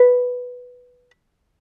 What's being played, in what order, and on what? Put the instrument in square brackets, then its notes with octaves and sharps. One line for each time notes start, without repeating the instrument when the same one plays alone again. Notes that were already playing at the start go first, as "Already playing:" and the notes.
Already playing: [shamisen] B4